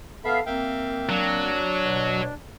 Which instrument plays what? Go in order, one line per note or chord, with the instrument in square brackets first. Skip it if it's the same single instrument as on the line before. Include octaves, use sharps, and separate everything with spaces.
[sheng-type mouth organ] B3 E5 B5 [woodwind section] A4 F5
[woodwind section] A#3 C4 [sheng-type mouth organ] E5 F5 G5
[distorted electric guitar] F#3 [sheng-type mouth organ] D4
[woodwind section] B2